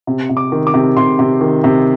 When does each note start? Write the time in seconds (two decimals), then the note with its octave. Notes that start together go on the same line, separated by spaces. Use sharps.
0.07 C3
0.29 C3
0.37 D6
0.52 D#3
0.67 D6
0.74 C3
0.97 C3 C6
1.19 C3
1.41 D#3
1.64 C3